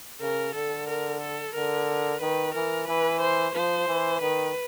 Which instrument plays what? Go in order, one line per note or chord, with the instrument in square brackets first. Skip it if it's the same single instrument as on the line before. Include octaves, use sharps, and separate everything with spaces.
[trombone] C#3 [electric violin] A#4
[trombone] D3 [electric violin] A4
[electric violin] A#4
A4
[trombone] D3 [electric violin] A#4
[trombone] D#3 [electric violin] B4
[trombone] E3 [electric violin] A#4
[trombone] E3 [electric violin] B4
[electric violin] C5
[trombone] F3 [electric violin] C5
[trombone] E3
[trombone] D#3 [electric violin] B4